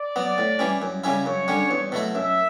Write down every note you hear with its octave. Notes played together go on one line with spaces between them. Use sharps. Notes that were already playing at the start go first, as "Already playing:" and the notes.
Already playing: D5
F#3 B3
A2
E3 G3 C#4
F#2
C#3 G3 C#4 E4
F#2 C#5
D3 G3 C#4
E2
B2 F#3 A3 E4
F#2 E5